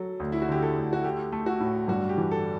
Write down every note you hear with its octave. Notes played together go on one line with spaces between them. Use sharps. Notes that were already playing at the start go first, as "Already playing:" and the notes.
Already playing: F#3 A4
D2
E4
F#4
D3 G4
A4
D2
F#4
A3 G4
A3
F#4
A2
G2 F#4
G4
E3
A4